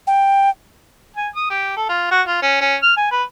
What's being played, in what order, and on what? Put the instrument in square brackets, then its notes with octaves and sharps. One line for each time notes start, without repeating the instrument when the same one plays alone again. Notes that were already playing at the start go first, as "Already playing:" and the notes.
[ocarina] G5
[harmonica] G#5
D#6
G4
A4
F4
F#4
F4
C#4
C#4
F6
G#5
B4